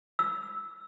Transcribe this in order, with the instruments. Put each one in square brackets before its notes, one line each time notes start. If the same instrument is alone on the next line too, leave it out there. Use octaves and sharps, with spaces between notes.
[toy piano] E6